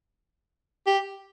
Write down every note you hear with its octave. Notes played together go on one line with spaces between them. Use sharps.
G4